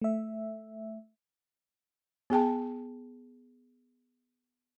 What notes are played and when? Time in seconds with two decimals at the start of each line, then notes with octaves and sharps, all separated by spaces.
0.02 A3 E5
2.30 B3 G#4 G5 A5